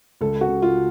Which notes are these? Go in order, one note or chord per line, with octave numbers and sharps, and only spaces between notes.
C#2 A4
F#4
C#3
F4